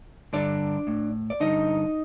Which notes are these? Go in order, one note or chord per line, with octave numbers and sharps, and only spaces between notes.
G2 D3 D4 D5
A2
D5
G2 D3 D#4 D#5